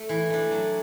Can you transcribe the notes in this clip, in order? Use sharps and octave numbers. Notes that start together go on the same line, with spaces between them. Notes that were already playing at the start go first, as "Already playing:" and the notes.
Already playing: A3
E3
A3 D4
F#3